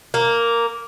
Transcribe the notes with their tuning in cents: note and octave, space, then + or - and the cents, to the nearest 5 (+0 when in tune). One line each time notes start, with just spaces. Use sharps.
A#3 -5